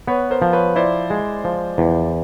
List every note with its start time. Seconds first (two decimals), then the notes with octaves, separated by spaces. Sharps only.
0.07 B3 B4 C#5
0.30 A#4 C5
0.42 F3
0.53 B4 C#5
0.76 E4 C5 D5
1.10 G#3
1.44 F3
1.78 E2